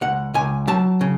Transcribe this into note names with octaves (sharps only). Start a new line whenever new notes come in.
C#2 F#5
C#2 G#5
F#3 A5
C#3